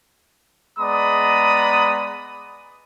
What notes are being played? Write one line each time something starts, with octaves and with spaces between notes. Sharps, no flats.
G#3 B3 D5 A#5 B5 D#6